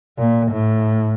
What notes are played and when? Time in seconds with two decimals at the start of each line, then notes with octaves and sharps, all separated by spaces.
0.19 A#2
0.51 A2